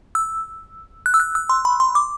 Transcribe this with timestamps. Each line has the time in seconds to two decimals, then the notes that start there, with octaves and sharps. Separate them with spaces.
0.15 E6
1.06 F#6
1.14 E6
1.20 F#6
1.35 E6
1.49 C6
1.65 B5
1.80 C6
1.95 D6